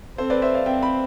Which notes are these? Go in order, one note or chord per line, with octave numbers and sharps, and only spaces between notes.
C4 A4 C5
B4 D5
C5 E5
D5 F5
C4 E5 G5
G5 B5